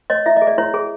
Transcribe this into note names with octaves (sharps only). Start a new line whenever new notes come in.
C#5 D#5
E4 E5
G#4 D#5
D5
E4 C#5
G#4